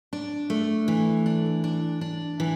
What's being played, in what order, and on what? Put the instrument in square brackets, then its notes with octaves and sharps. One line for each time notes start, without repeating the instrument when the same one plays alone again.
[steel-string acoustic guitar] D4
A3
E3
D4
D4
D4
E3